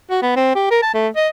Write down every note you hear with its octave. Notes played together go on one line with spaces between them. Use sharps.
F#4
B3
C4
G4
A#4
A5
A3
D#5